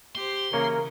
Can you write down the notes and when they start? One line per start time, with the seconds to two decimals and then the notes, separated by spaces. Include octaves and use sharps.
0.15 G4 C5 C6
0.53 C#3 E3 A#3 A#4 C#5